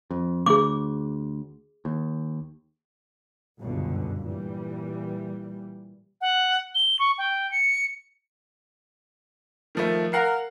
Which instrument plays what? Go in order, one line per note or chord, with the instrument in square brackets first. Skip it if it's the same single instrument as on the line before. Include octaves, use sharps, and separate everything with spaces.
[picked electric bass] F2
[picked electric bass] D2 [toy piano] G#4 D6
[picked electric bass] D#2
[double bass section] G1 C#2 F#2 B2 D3
A#2 E3 G3
[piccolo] F#5
G7
C#6
G5
C#7
[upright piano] D#3 F3 A3
[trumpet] A#4 [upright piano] F5 F#5 C7